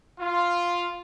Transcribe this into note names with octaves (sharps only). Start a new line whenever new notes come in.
F4